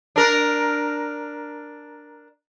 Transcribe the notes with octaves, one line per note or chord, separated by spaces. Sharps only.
D4 A#4